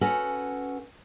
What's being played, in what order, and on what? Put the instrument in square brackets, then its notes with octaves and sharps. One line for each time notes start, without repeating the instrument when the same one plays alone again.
[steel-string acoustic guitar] C#4 F#4 A4 B4 F#5